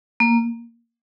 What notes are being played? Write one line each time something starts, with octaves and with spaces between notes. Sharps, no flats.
A#3